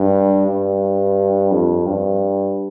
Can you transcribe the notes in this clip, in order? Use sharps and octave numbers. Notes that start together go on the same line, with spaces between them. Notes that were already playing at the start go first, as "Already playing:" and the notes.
Already playing: G2
G2
F2
G2